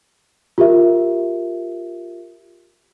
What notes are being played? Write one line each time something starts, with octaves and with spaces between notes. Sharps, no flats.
F4 G4 A#4 E5